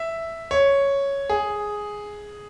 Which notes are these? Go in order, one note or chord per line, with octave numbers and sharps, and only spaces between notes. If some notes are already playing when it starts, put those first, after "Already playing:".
Already playing: E5
C#5
G#4